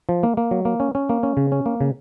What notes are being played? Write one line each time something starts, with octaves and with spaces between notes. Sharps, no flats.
F3
A#3
A#3
F#3
A#3
C#4
C#4
A#3
C#4
C#3
C#4
A#3
C#3